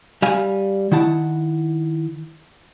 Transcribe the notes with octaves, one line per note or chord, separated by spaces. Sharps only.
G3 F5 G#5
D#3 E4 F#5 A5